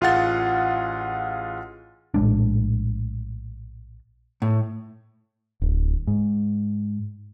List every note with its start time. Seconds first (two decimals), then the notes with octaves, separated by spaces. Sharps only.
0.01 A1 F4 G#4 F5 F#5 A6
2.14 A#1 A2 G#3 D4
4.42 A2
5.62 D1
6.07 G#2